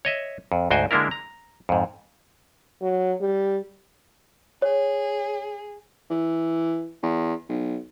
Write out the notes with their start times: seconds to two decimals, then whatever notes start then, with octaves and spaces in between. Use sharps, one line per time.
0.05 C#5 D#5 E5
0.52 F2
0.71 D2 G#2 F#4 C5 G5 G#5
0.91 D3 G#3 A#3 D4 E4 A#4
1.11 A#5
1.69 F2 G#2
2.82 F#3
3.21 G3
4.62 G#4 C#5
6.10 E3
7.03 E2
7.49 B1